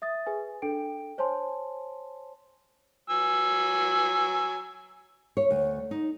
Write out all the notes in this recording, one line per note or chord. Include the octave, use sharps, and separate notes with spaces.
E5 D#6 A6
G#4 B4 G#5
D4 A4 G5 D7
C5 C#5 G#5 A5 C6
F#3 G#5 E6
C#5
D2
D#4